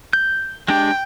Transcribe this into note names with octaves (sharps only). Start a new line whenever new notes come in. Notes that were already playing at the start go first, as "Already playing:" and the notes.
G6
G#3 D4 G4 G5